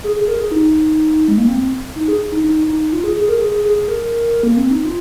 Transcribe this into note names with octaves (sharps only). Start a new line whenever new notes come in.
G#4
G#4
A#4
G#4
D#4
G#3
A#3
C4
D#4
G#4
D#4
D#4
D#4
F4
G#4
G#4
A#4
G#4
G#4
A#4
A#3
C4
D#4
F4